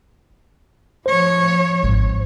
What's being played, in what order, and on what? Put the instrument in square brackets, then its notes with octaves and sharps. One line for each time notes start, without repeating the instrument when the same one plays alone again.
[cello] F3 C#5 [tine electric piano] C5
[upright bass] G#1